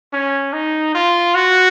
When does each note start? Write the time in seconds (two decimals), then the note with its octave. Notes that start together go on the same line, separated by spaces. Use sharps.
0.13 C#4
0.53 D#4
0.95 F4
1.35 F#4